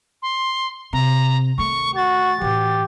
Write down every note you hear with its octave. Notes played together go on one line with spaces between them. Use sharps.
C6
C3 A#5
D#3 A3 C#6
F#4 A6
A2 E3 G4